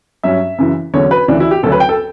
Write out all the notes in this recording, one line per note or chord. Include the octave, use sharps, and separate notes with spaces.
G2 F#3 C#4 E5
F#2 C#3 E3
E2 D3 F#3 C#4 C#5
B4
D2 C#3 E3 D4
E4
G4
D2 C#3 F#3 C#4 A4
B4
G5
A4